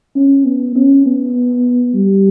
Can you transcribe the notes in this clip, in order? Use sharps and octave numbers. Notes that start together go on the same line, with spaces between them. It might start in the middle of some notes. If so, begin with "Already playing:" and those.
C#4
B3
C#4
B3
G3